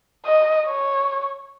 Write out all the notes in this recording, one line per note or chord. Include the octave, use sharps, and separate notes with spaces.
D#5
C#5